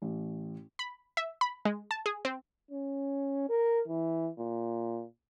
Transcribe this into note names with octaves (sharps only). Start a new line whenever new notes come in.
A1
B5
E5
B5
G#3
A5
G#4
C4
C#4
A#4
E3
A#2